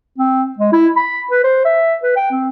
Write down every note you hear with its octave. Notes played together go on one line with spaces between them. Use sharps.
C4
G#3
E4
B5
B4
C5
E5
B4
G5
C4